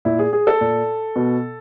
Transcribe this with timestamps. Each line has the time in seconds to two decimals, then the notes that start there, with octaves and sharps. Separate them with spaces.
0.05 A#2 E4
0.19 G#4
0.33 G#4
0.47 A4
0.61 A#2
1.16 B2